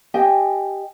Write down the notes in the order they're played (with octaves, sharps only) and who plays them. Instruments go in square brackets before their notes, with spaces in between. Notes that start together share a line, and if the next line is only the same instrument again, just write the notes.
[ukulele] G4 D#5 G#5